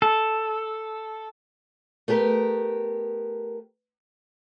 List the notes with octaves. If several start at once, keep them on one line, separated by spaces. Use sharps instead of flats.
A4
A3 B3 G4 A#4